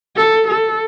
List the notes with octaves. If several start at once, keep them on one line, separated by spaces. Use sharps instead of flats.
A4
A4